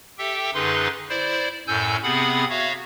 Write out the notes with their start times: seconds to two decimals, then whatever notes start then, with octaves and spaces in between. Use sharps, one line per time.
0.18 G4 A4 E5 G5
0.54 F#2 D3 D#4 G#4 B4 C6
1.09 E4 C5 D5
1.67 F#2 A2 A4 G#5 E6 G6
2.03 C3 B3 C4 G#4 F#5 B5
2.50 F#4 C#5 E5 F5